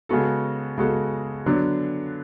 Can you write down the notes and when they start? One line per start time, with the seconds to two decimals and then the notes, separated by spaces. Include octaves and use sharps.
0.09 C#3 G#3 B3 F#4 A4
0.78 C#3 G#3 B3 F#4 A4
1.46 D3 F#3 B3 D4